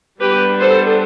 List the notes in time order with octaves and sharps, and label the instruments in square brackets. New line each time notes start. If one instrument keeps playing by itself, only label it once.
[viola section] G3 B3 D4 G4 B4
A4 C5